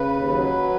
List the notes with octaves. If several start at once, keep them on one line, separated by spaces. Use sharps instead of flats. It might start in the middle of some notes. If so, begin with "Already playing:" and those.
Already playing: C#3 B4
D#2
F#3